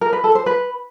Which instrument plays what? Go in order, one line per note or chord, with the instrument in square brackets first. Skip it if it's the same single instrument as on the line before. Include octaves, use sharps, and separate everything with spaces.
[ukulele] A#4
B4
A4
C5
B4